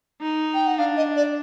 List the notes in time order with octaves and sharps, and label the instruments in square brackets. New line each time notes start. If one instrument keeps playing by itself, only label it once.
[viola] D#4
[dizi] G5
F#5
[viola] D4 [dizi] F5
[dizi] D#5
D5